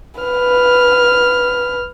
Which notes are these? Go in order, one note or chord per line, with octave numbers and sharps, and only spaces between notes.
B4 F6